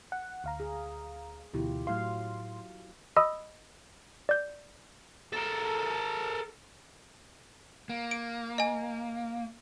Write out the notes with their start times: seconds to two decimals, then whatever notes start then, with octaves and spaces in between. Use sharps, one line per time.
0.12 F#5
0.44 D2 F5 A#5
0.60 G#4
1.54 D2 B2 E3 E4 F4 G4
1.87 A2 F#3 F5 C6
3.16 D#5 B5 D#6 E6
4.29 D5 G6
5.33 A4 A#4
7.89 A#3
8.11 D7
8.58 D#5 G#5